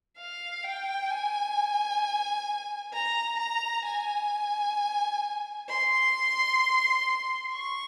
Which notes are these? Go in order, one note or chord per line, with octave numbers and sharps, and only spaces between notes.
F5
G5
G#5
A#5
A#5
G#5
C6
C#6